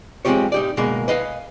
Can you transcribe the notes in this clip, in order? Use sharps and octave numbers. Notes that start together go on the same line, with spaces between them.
G#3 C4 D#4 F4 G4 C#5
D#4 G4 D5
B2 G#3 A#3 A#4
B4 D#5 F5 G#5